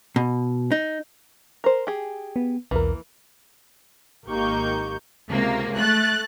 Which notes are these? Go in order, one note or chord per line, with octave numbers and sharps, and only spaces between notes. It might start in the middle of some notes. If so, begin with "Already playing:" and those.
B2
D#4
A#4 C5
G4 G#4
B3
B1 E2 E3 A#3 A#4
G#1 A#3 D#4 G4 C#6 G6
C#2 C3 A#3
A3 F#6 A6